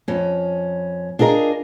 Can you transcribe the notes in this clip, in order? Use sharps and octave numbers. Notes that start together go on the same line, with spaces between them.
F2 C#4
D4 F4 G#4 A#4 D#5